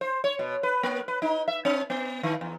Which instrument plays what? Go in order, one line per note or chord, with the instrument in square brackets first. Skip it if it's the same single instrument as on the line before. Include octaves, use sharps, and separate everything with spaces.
[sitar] C5
C#5
B2
B4
A#3
B4
D#4
E5
C4
B3
D#3
E2